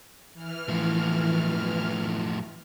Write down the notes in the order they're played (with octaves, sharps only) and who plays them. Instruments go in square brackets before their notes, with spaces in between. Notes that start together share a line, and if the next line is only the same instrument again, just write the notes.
[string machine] E3 F6
[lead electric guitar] A2 F3